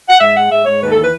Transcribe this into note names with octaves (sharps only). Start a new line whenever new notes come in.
F#5
G#2 E5
G#3 F#5
G#2 E5
G#2 C#5
D#2 B4
A4
E3
B4